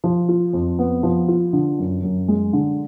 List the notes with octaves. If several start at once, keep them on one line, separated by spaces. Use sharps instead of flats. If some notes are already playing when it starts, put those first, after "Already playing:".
F3
F4
F2
B3
F3
F4
D3
F#2
F#2
G#3
D3